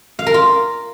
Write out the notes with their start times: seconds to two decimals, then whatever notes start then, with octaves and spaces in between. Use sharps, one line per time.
0.19 F5
0.26 A#4
0.34 F4